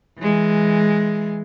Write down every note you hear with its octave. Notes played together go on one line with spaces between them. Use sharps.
E3 G#3